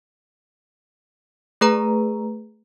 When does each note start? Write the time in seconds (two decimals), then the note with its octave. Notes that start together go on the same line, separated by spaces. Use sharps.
1.61 A3 G#4 B4 A#5